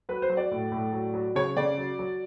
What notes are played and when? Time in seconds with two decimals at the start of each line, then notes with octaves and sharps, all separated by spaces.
0.09 F#3 B4
0.22 C5
0.30 F#3
0.37 D5
0.51 A2
0.72 A2
0.93 F#3
1.14 F#3
1.35 C#3 C#5
1.57 C#3 D5
1.78 F#3
1.99 F#3